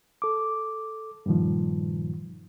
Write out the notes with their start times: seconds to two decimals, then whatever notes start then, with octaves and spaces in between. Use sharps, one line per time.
0.22 A4 D6
1.26 G2 A#2 D#3 F3